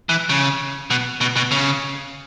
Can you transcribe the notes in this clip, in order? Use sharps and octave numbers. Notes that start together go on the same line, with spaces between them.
E3
C#3
B2
B2
B2
C#3